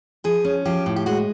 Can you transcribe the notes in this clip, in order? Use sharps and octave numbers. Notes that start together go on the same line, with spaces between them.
F3 G#4
C#4
F3 G4
A2
G4
G#3 F#4